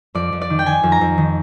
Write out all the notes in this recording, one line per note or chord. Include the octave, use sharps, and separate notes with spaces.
F2 D5
F2
D5
D#3
G5
D#3 G#5
F2
A#5
F2
D#3